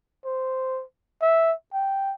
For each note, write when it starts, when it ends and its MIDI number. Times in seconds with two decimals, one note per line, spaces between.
0.25 0.83 72
1.22 1.53 76
1.74 2.14 79